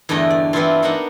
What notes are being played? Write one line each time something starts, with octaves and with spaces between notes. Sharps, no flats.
E2 G2 D3 A3 D#5 G5
D5
E3 B3 C4 D4 E4 F4
A#3 B3 D4 D#4 F#5